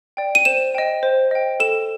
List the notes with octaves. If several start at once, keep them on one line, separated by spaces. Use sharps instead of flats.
D5 G5
D#7
C5 E7
D#5 G5
C5
D#5 G5
A4 E7